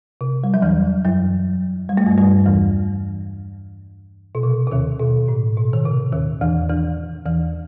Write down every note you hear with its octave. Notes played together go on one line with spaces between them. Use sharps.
C3
G3
F#3
E2 E3
F#2 F#3
G3
A3
G2 G3
G2 G3
E2 E3
B2
C3
C3
D#2 D#3
B2
A2
B2
D#3
C3
D#2 D#3
E2 E3
E2 E3
E2 E3